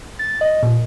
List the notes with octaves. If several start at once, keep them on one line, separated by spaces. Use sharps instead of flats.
A6
D#5
A#2